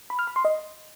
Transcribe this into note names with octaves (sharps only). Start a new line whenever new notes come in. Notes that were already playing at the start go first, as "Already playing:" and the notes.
B5
F6
B5
C6
D#5